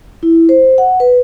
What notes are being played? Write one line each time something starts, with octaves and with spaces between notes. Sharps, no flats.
E4
C5
F#5
B4